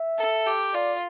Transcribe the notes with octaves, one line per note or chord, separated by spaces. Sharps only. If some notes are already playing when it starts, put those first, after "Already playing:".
Already playing: E5
A4
G4
F4 D5